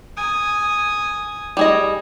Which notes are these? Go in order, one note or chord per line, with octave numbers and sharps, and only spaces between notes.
G#5 D#6
G3 G#4 D#5